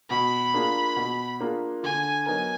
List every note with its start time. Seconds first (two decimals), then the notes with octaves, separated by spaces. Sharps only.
0.10 B2 B5
0.54 A#3 D4 F4 G#4
0.96 B2
1.41 A#3 D4 F4 G#4
1.83 D3 G#5
2.26 F#3 B3 D#4 A#4 G#5